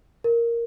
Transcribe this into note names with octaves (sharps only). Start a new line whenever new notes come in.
A#4